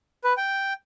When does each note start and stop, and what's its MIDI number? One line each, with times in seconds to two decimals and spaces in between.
0.24 0.33 71
0.37 0.73 79